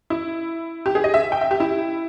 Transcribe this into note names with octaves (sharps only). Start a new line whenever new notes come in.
E4
G4
G#4
D#5
E5
G5
E5
G4
E4